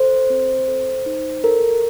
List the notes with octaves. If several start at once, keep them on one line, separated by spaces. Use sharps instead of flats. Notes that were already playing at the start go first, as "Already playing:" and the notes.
Already playing: A4 C5
C4
A4
D#4
A4 A#4